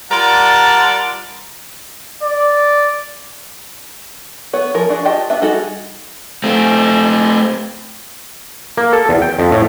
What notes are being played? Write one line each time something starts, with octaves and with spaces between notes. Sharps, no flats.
G3 F4 A#4 D5 F#5 A5
D5
B3 C#5
F3 G#4 A#4
D4 F#4 G#4
F4 G4 D#5 G5 A5
B3 D4 E5
G3 D#4 F#4 G#4 A4
A3 C4
A#3
A4
E2
G5
F2
A2